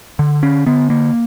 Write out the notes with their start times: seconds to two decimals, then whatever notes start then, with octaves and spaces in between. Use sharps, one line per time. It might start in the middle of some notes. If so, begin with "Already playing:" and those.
0.19 D3
0.43 C#4
0.66 D3 B3
0.90 A#3